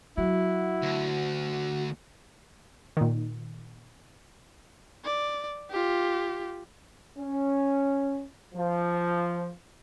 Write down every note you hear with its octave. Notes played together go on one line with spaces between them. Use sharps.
F#3 E4 F#4
D2
A#2 D#3
D5
F4 G4
C#4
F3